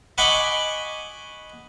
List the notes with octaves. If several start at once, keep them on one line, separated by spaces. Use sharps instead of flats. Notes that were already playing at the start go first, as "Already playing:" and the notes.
D#5 F#5 G#5 B5 C#6 D6